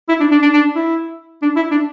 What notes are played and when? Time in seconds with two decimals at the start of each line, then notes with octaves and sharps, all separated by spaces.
0.09 E4
0.20 D4
0.31 D4
0.42 D4
0.53 D4
0.76 E4
1.42 D4
1.56 E4
1.71 D4